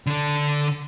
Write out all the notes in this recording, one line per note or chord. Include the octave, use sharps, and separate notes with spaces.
D3 D4